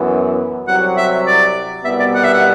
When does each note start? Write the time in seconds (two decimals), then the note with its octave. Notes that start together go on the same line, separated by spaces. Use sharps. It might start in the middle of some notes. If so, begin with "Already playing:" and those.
Already playing: F#2 E3 B3
0.67 C2 C3 F#3 F#5
0.97 E5
1.27 D5
1.85 C2 B2 G3 B3 E5
2.00 D5
2.14 F#5
2.24 E5
2.34 F#5